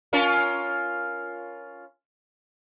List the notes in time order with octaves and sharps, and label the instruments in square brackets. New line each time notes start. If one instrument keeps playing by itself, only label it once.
[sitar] C#4 F4 A#4